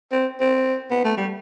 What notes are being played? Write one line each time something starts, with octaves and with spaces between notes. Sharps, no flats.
C4
C4
B3
A3
G3